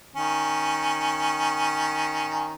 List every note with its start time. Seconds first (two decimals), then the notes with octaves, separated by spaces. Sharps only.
0.16 D#3 C#4